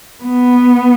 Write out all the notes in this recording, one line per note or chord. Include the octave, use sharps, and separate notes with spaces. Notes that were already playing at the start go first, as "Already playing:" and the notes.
B3